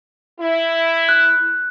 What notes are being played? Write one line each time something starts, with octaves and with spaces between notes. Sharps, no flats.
E4
F#6